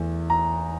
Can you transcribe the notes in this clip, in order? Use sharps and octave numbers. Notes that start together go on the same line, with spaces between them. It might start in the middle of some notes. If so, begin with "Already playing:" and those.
Already playing: E2 E3 A3
A#5